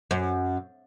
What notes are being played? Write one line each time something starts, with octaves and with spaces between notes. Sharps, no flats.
F#2